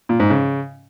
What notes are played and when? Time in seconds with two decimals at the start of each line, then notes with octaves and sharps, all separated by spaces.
0.09 A#2
0.20 G#2
0.30 C#3